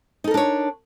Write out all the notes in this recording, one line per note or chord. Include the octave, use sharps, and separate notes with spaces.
D4 D#4 A4 A#4 C#5